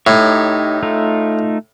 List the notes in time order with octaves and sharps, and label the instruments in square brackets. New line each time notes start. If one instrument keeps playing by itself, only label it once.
[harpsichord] A2 [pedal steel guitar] D#4 G4 C#5
[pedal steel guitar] A3 D#4 F4